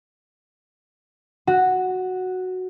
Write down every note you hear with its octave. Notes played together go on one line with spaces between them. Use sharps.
F#4